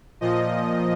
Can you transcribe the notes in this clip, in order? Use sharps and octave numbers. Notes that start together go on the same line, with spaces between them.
A#2 F3 D#5